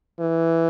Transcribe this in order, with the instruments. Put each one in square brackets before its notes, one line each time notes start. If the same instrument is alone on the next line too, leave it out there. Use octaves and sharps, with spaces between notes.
[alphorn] E3